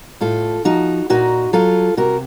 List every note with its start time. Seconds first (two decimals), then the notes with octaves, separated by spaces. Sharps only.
0.21 A2 F4 A4
0.65 F3 D#4 F#4
1.10 A#2 D#4 F#4
1.53 F#3 F4 A4
1.97 C3 F#4 A#4